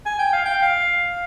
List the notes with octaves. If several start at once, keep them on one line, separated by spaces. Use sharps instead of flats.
G#5
G5
F5
G5
F5